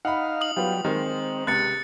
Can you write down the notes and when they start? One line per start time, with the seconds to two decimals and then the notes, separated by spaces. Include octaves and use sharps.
0.05 D#4 F5 F#5 B5
0.41 D#6 F#7
0.56 F#3 G3 B3 F4 G4
0.85 D#3 G#3 C4
1.47 C#2 C3 F#6 A6 C#7